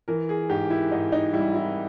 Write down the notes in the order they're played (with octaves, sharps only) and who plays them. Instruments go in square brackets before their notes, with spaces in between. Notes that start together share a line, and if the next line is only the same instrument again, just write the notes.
[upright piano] E3 A#4
G#4
G#2 G4
E4
G#2 D#4
D#4
G3 E4
E4